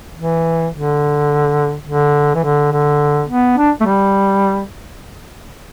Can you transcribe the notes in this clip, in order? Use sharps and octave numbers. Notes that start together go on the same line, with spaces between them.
E3
D3
D3
E3
D3
D3
B3
D4
A3
G3